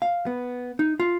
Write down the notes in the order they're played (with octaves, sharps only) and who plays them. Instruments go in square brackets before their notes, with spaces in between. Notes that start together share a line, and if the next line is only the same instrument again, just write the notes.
[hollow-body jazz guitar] F5
B3
D#4
F4